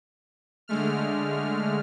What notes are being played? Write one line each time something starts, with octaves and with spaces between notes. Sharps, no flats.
D3 G#3 A3 F6